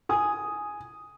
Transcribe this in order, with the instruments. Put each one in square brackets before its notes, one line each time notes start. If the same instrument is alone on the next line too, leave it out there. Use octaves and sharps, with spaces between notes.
[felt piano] G#5 D#6